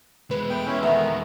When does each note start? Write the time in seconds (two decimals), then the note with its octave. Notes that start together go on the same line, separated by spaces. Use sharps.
0.31 E2 G#3 B4
0.50 A3 B3 G5
0.66 C#4 E4
0.83 D#3 A3 B3 A#4 E5 A#5